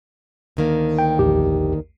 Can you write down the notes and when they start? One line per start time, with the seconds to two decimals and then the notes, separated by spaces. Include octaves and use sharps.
0.57 D2 D#3 A#3
0.99 G5
1.19 A#1 E2 G4